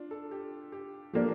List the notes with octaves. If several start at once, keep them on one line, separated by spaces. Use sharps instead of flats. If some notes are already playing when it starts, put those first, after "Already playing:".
Already playing: D4 F4
A4
G4
G4
F3 A#3 D4 G4